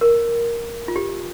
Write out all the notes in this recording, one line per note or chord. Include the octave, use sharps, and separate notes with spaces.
A#4
F4
G4